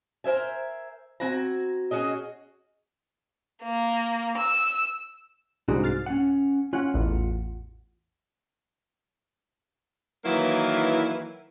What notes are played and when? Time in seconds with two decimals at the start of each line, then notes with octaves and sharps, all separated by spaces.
0.24 A#4 C5 E5 G#5
1.20 C4 F#4 G#5 A#5
1.91 C#4 F#4 G#4 D#5
3.63 A#3
4.38 E6
5.68 C2 G#2 D4 F#4
5.84 F6 A6 C7
6.06 C#4 F#5
6.73 C#4 F4 F#5 F#6
6.94 A1 E2
10.25 D#3 E3 F#3 A#3 E4 B4